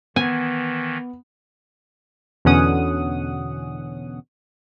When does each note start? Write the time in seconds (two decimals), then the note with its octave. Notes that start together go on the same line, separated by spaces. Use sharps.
0.16 D#3 E3 B3 G#5
2.45 E2 B2 D3 C#4 F#5 D#6